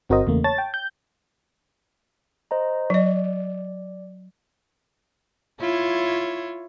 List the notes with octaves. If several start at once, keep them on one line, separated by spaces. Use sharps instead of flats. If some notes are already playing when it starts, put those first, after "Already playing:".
G1 C4 F#4 A#4 C5 D#5
E2 C#3 A3 A#3
C#5 A5 A6
G5
G6
C5 D#5 A#5
F#3 D5 D#5
E4 F4 C#5